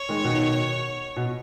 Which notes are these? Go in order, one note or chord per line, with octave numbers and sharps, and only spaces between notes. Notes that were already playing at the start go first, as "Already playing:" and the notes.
Already playing: C#5
D#3 G#3
B2 D#3
B2